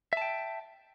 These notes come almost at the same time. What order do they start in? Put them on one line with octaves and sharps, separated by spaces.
E5 A5 G5